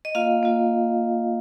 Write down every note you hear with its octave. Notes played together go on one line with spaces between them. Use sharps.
D#5
A#3 F4 F5
A#3 F4